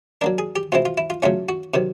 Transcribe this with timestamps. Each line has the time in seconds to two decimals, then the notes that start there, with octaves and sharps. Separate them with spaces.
0.21 F#3 A#3 D4 A#4
0.38 G#4
0.56 G4
0.72 B2 G#3 C4 E4 F4
0.85 F4
0.98 E4
1.10 F4
1.22 C#3 F#3 A3 C#4 F4
1.49 F#4
1.74 C3 D#3 F#3